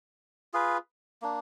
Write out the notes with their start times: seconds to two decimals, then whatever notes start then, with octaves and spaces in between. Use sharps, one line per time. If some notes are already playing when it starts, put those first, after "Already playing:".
0.53 F4 G#4 B4
1.22 A#3 D4